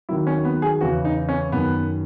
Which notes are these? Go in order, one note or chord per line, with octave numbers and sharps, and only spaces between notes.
D#2 D#3 F#3 E4
C#4
B3
G#4
E2 C#3 E3 F#4
D#4
C#4
F#2 D#3 F#3 B3